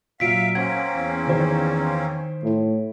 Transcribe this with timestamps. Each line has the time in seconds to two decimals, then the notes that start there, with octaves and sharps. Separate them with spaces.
0.20 A#2 F#3 E5 F5 B6 D7
0.55 A#3 C4 C#4 F#5 G#6
0.94 E2
1.28 D#3 C5
2.43 A2